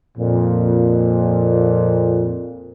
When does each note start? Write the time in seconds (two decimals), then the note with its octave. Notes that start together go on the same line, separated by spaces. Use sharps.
0.18 F2 A#2